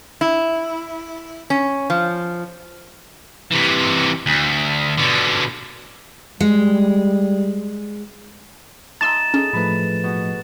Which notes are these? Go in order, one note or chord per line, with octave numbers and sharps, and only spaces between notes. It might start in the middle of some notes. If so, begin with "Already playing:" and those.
E4
C#4
F3
C3 E3
D2
B2 D3
G3 G#3
D#4 E5 A5 A#5 C6 E6 A6 E7
C#4 D#4 G#4 A4
A2 F3 A3 B4 B5
B2